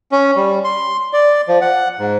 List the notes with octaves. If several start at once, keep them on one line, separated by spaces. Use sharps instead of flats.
C#4
G3
C6
D5
F3
F#5
G#2